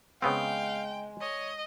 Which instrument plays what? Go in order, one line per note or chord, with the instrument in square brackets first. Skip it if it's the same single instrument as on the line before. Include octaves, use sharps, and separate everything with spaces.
[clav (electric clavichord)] C#3 B3 C4 [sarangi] G#3 [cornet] F5 [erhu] G5
[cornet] C#5 [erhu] D#5